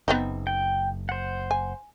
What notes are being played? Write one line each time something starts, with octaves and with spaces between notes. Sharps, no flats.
F#1 B3 C4 D#4
G5
C5 F#5
G#5